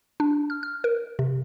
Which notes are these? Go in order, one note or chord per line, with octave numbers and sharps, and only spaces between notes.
D4
F6
F6
A#4
C3